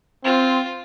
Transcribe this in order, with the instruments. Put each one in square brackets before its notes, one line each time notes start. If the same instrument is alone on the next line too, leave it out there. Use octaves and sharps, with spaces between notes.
[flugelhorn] C4 [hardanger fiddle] F4